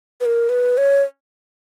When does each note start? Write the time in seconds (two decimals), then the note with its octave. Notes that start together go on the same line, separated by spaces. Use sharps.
0.21 B4
0.25 A#4
0.49 B4
0.78 C#5